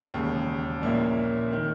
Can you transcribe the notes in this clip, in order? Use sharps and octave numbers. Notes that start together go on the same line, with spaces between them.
E1 D#2 C#3
A#1 A#2 A#3 C#4 E4
D#3